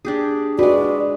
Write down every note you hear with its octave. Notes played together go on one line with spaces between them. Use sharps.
D4 G4 G#4
G#3 F#4 B4 D5